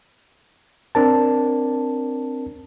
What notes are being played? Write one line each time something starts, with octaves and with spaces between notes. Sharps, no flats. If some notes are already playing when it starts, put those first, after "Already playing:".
C4 D4 A#4 A5